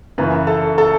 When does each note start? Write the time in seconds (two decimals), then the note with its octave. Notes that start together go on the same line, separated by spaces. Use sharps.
0.18 F#2 C#3 E3 B4
0.47 A4
0.78 A4